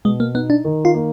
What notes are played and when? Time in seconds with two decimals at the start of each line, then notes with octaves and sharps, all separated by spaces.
0.05 B2 G#3
0.20 A#3
0.34 B3 D#4
0.50 D4
0.65 D#3
0.85 F4
0.94 A#3